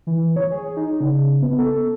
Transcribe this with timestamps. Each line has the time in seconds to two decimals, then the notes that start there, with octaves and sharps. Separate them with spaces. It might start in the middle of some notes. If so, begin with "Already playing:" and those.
0.07 E3
0.36 C#5
0.51 G#4
0.77 D#4
1.01 C#3
1.42 B3
1.59 A4